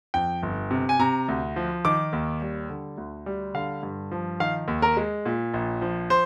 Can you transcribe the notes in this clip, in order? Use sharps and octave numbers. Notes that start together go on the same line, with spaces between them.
F2 G5
G1
C3
G#5
C3 A#5
D2
F3
D#3 D6
D#2
G3
D3
D2
G3
D3 F5
G2
F3
D#3 F5
D#2
A#4
G#3
A#2
A#1
F3
C5